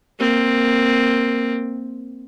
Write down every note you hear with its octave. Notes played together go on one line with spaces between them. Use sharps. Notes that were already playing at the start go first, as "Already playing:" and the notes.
A#3 C4